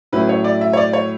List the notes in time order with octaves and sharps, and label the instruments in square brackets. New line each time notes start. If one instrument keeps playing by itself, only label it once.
[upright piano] A2 F#3 C#4 E4 [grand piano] B4
[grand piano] C#5
D5
E5
C#5
D5
C#5